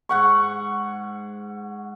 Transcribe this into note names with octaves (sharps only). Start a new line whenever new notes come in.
G#2 F#5 C#6